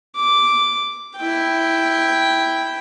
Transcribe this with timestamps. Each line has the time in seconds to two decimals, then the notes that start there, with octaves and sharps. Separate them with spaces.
0.16 D6
1.17 E4 G5